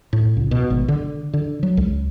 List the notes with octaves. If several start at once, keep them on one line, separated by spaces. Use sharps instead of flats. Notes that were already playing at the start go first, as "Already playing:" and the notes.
A2
C#2
B2
G#1
D3
D3
F#3
C#2